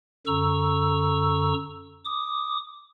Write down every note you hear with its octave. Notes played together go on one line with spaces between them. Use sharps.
F#2 D3 A4 A#5 C#6 E6
D6 D#6